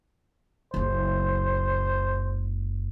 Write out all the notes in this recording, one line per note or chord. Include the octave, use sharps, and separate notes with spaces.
F#1 C#2 C5